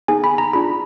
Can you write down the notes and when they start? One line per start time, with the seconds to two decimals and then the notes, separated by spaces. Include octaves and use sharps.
0.08 B3 D#4 G#4 G#5
0.24 B5
0.38 A#5
0.53 D4 F4 G#4 B5